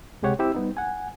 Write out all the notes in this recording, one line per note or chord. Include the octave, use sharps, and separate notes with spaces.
C#2 C3 G#3 G4 C#5 F#5
C4 E4 G4 E6
G3 B3 D#4
F#5 G#5